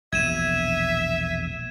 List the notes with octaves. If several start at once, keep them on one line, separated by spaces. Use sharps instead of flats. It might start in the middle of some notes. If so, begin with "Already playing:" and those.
E1 A#1 E5 G#6 D#7 E7